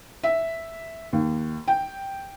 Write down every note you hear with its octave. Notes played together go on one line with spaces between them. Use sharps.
E5
D#2
G5